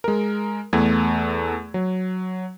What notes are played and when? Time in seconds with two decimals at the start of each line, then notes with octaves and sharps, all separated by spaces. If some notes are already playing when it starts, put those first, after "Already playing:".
0.04 G#3 A#4
0.73 E2 A3 G#6
1.74 F#3